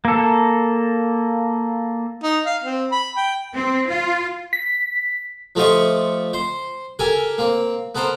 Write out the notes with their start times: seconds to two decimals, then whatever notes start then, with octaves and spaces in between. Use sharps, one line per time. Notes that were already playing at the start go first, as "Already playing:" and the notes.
0.05 A#3 A4
2.23 D#4
2.46 F5
2.63 C4
2.92 B5
3.17 G5
3.54 C4
3.88 F4
4.53 B6
5.55 F3 A3 F4 G4 D#5 C#6
6.33 C5 C6
6.99 G4 A4 A#4 G#5
7.38 A#3 C4
7.95 B3 A4 A#4 C5